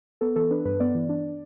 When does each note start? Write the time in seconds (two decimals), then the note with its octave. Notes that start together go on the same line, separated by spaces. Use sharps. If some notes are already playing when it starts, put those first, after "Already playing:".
0.21 B3 A4
0.36 E3 A4
0.51 D4 B4
0.65 G2 B4
0.80 B3 D5
0.95 E3
1.09 D4